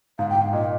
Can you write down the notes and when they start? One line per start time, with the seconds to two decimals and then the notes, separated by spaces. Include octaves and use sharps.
0.19 G#2 F5
0.30 G5
0.35 G#2
0.41 F5
0.53 A#2 D#5